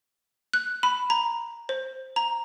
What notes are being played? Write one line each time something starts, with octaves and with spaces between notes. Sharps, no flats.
F#6
B5
A#5
C5
A#5